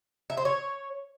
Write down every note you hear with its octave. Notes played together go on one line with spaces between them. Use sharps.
E5
C5
C#5